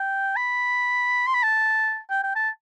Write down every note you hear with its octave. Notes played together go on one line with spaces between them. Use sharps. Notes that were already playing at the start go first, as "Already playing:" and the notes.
Already playing: G5
B5
C6
B5
A5
G5
G5
A5